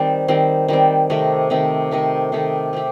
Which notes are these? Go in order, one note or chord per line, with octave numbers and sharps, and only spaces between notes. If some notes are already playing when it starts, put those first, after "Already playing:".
Already playing: D#3 G3 C4
D#3 G3 C4
D#3 G3 C4
C3 D#3 A3
C3 D#3 A3
C3 D#3 A3
C3 D#3 A3
A3 C4 G4